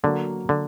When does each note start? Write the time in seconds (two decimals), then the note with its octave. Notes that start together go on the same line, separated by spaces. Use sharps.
0.03 D3 F#3 A#3 F#4
0.49 D3